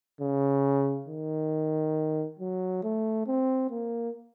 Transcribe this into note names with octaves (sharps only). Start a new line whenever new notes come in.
C#3
D#3
F#3
A3
C4
A#3